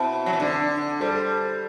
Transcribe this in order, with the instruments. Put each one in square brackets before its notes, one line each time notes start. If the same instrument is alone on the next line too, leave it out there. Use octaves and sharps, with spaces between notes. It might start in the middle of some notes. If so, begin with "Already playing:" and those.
Already playing: [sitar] B2 [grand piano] C4 E4
[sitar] F#3
E3
[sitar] D3 [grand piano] D4
[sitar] G3 [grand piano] A4 C5